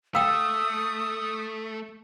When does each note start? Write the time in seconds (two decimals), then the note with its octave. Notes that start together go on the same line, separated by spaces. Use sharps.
0.15 A3 F5 G5 D#6 E6